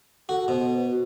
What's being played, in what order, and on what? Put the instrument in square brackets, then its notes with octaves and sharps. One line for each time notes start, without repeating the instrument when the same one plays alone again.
[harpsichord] F#4 [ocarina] A4
[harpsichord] B2 [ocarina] C5
[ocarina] B4
F#4